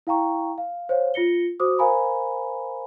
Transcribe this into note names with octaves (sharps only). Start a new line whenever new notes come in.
E4 F5 G5 A#5 C#6
F5
C5 C#5 F5
F4 A#6 C#7 G7
F#4 C5 D6 D#6
A#4 C5 F5 G#5 A#5 B5